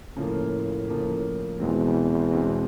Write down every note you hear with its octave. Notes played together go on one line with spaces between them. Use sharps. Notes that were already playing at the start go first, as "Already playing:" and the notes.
A2 C#3 F3 A#3
C#3 F3 A#3
E2 B2 G#3 C4
B2 G#3 C4